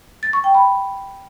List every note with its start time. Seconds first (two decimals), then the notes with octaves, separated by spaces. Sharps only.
0.23 A6
0.33 C#6
0.44 G5
0.55 B5